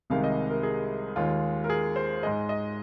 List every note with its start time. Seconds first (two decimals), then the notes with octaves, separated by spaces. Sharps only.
0.10 C2 C3 D#3 G#3 F5
0.24 D#5
0.50 A#4
0.63 G#4
1.16 D#2 D#3 G#3 F4
1.64 A#4
1.70 G#4
1.96 C5
2.23 G#2 G#3 D#5
2.49 D#5